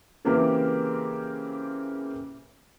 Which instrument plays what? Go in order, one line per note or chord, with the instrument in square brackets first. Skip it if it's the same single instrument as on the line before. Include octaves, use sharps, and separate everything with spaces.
[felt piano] C#3 E3 A#3 C4 G4 A#4